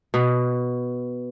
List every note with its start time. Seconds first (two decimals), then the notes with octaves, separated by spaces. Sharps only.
0.14 B2